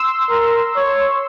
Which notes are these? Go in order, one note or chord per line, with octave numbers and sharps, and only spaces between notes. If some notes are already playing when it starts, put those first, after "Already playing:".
Already playing: C6 E6
A#4
C#5